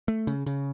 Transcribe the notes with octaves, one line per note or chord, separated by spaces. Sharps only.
A3
C#3
C#3